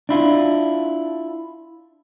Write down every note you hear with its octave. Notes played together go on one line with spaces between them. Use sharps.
D4 E4 F4